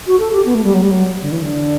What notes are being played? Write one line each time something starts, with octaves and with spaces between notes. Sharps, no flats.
F#4
A4
G4
B3
A3
G3
F#3
G3
F#3
D3
E3
D3